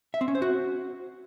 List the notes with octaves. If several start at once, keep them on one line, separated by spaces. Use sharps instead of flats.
E5
C4
C#4
C5
F#4